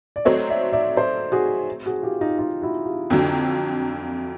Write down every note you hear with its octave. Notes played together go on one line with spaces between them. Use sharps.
D5
F#3 A3 C4 C#5 D#5
D5 E5
D5 E5
C5 D5
F#4 G#4
F#4 G#4
F4 G4
D#4 F4
D#4 F4
E4 F#4
F4 G4
F2 D3 F#3